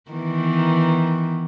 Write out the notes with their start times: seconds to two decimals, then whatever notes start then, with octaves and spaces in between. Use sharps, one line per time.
0.11 D#3 E3 B3